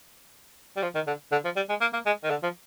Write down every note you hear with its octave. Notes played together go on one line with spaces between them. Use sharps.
G3
F3
D#3
D3
D3
F3
G3
G#3
A#3
A#3
G#3
D#3
D3
F3